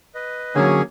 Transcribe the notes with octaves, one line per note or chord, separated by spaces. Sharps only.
B4 D#5
D3 F#3 A#3 C#4 G#4 C#5 G#5